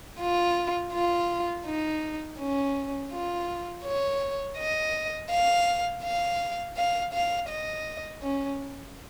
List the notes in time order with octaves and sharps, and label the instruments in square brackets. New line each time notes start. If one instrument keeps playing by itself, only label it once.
[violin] F4
F4
D#4
C#4
F4
C#5
D#5
F5
F5
F5
F5
D#5
C#4